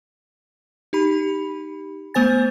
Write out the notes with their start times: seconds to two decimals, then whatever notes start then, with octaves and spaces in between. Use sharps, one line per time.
0.93 D#4 G4 B5
2.14 A3 B3 C5 G#5 A6